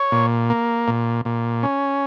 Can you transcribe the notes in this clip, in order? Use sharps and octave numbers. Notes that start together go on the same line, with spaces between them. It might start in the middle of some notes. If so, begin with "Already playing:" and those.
Already playing: C#5
A#2
A#3
A#2
A#2
C#4